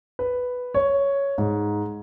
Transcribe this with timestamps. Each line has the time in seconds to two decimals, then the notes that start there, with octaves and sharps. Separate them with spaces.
0.19 B4
0.74 C#5
1.38 G#2